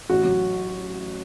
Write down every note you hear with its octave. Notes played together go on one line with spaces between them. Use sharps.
A1 F#4
F#3